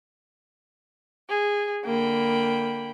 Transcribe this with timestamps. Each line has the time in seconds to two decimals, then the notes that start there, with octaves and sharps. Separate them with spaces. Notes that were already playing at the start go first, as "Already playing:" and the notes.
1.28 G#4
1.84 D3 A#3 G5 B5